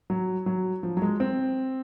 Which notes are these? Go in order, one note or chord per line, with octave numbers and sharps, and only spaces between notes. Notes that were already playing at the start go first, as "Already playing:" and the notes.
F#3
F#3
F3
F#3
G#3
C4